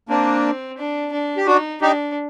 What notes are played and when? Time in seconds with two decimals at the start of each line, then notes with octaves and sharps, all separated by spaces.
0.09 A#3 C4 D4
0.78 D4
1.12 D4
1.37 G4
1.47 D4 D#4 F#4
1.81 D4 D#4 G4